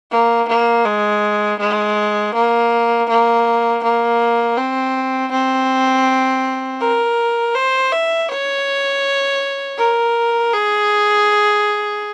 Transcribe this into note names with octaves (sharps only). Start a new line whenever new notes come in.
A#3
A#3
G#3
G#3
A#3
A#3
A#3
C4
C4
A#4
C5
E5
C#5
A#4
G#4